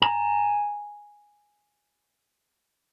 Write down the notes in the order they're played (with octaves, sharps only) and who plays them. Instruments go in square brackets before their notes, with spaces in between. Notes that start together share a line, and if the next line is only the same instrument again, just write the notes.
[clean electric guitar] G#5 A#5